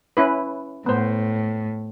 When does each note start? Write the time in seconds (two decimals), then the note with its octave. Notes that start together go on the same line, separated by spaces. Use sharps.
0.17 C#4 E4 B4
0.86 A2 B3 C5